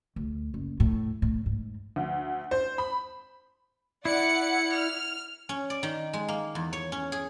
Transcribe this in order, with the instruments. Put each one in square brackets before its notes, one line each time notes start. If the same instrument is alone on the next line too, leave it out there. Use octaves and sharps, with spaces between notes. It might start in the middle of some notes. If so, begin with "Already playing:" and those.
[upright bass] D2
F#1
A2
A2
G#2
[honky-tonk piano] D2
C5
B5
[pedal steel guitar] E4 [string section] D5 F#5 C#7
[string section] F6
[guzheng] C#4
D5
D#3
G#3
A#3
E2
C#5
C#4
G#4